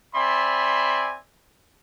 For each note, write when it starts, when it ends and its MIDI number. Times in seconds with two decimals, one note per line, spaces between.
0.14 1.16 60
0.14 1.16 74
0.14 1.16 76
0.14 1.16 80
0.14 1.16 83
0.14 1.16 84